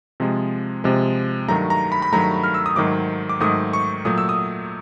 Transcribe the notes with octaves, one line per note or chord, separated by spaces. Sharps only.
C3 F3 G#3
C3 F3 G#3
G2 D#3 F#3 A3 A#5
A#5
B5
B5
G2 D#3 F#3 A3 A#5
F6
E6
D#6
G#2 D#3 F#3 A3 D6
D6
G#2 D#3 F#3 A3 D#6
C#6
A#2 F#3 A3 D#6
E6
D#6